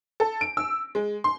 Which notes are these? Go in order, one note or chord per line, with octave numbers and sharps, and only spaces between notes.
A4
D7
E6
G#3
C6